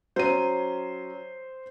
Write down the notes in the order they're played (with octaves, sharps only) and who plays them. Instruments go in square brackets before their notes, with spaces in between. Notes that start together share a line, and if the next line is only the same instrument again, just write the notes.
[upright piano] F#3 C#4 [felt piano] C5 D#7